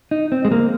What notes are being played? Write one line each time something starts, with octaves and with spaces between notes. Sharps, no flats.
D#4
C4
G#3
A#3